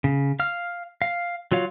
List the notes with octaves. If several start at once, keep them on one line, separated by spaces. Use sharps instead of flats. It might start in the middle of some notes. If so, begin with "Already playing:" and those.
C#3
F5 F6
F5
F#3 F4 C#5 F5